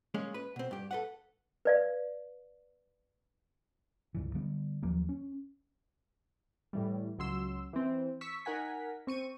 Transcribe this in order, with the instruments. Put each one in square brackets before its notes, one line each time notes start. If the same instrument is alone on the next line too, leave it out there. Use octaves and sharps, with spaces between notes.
[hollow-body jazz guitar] G#3 A#3 C#4
B4
B2 C4
G2 G4
A4 B4 F#5
[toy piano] B4 D5 F5
[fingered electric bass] C#2 G2 E3
D3 G3 B3
D#2 F3 F#3 A#3
C#4
[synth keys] A2 E3 G3
C#2 F#3 C6 E6
E3 C4
C#6 E6 B6
D#4 A#4 F#5 G#5 B6
C4 C#6 D#7